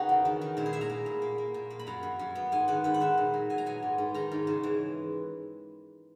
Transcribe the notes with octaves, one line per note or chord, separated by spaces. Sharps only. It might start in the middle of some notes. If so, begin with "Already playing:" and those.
Already playing: C#3 B3 D#4 F#4 G#4 A#4
E2
D#3
D#3
A#2 E4
G#4
A#2 E5
A#5
A#3
A#2
A#3
A#3
A#2
A#3
B5
F#2 A#5
F#2
F#2
B3
G#2 G#5
D#3 F#5
G#2 B4
F#5
D#3 E5
A#2
F#3
A#2 G#5
A#5
B3 G#5
G#2
G#2
D#3 A#5
G#2
C#3
E3